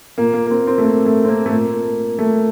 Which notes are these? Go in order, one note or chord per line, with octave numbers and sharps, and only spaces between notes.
A#2 A#3
A#3
A#3
C4
C4
A3
A#3
A3
C4
A#3
A3
A#2 A#3
A3